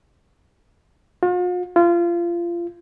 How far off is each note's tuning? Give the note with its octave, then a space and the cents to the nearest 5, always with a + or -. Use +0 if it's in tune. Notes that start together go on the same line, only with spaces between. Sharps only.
F4 +45
F4 -25